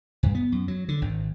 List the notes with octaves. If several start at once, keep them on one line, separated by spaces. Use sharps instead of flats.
G2
B3
F#2
F#3
D3
G#1